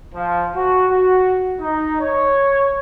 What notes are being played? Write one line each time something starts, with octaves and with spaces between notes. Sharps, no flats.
F3
F#4
F#4
D#4
C#5